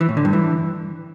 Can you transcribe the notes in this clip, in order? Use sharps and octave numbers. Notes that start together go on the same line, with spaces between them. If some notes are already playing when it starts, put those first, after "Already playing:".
E3
A2
D3
G2
E3